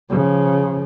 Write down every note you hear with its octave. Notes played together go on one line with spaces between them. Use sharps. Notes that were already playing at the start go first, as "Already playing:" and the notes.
C#3 F3